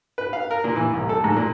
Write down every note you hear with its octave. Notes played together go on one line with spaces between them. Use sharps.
B4
F5
A#4
A#2
E3
C2
A4
G#2
A#2